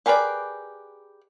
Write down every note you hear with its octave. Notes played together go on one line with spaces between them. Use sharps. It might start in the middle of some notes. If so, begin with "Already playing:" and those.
G4 G#4 A#4 B4 D5